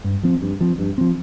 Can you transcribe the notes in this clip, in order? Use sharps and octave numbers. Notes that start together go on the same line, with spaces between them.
G2
F3 C4
G2
F3 C4
G2
F3 C4